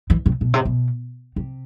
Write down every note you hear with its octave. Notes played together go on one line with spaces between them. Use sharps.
E3
C3
B2
C3
B2
C3